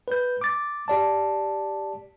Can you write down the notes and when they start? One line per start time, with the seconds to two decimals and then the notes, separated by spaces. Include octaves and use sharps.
0.08 B4 G6
0.41 D6 A6
0.88 G4 D5 A5